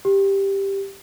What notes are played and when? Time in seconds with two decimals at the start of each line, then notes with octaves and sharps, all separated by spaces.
0.05 G4